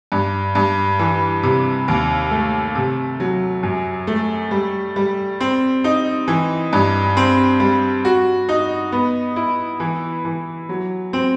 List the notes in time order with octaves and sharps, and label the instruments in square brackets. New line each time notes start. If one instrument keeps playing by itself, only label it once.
[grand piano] G2
G2
E3
C3
D#2
A3
C3
F#3
F#2
A3
G3
G3
C4
D#4
E3
G2
C4
G3
F#4
D#4
B3
E4
E3
E3
F#3
C4